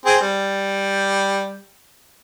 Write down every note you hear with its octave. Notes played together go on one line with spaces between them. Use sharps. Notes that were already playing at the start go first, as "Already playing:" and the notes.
C4 G#4
G3